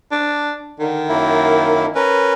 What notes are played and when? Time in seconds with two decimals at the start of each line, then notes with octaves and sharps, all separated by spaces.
0.11 D4
0.79 D3 D#3
1.08 F#2 A#3 E4
1.95 C#4 A#4 B4